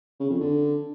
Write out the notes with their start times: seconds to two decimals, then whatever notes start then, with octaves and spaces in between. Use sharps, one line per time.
0.20 C#3
0.30 F2
0.40 D3